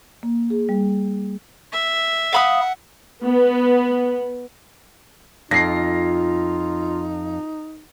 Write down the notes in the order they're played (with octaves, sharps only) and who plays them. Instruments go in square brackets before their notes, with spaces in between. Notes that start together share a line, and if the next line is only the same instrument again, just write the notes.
[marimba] A#3
G#4
G3
[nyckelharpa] E5
[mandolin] F5 B5 D#6 [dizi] F#5
[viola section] B3
[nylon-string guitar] F2 [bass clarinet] D#4 [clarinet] F4 [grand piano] A#6 C7